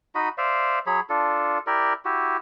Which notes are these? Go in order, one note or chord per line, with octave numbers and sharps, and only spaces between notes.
D#4 F#4 D#5 B5
C5 D5 E5 F5
F#3 G#4 C#5 B5
D4 F4 A4
E4 G4 A#4 D5
E4 F#4 G4